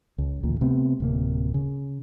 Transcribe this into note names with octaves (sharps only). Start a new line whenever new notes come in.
C#2
A1 D2 A#2
C3 A3 B3 C4
D1 C3 A#3
C#3